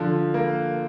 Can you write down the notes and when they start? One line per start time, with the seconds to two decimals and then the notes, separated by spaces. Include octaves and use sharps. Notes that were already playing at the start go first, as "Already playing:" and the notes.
Already playing: D3 F3
0.34 A#3